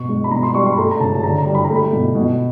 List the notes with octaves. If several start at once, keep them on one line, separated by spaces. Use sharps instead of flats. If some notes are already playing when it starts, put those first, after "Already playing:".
Already playing: B2 C#6
G#3
B5
B2 A#5
C6
G3 C#6
C6
B5
A3 A#5
A#5
C#3 A5
A5
D3 A#5
A#5
G3
B5
A3 A#5
B5
B2
B2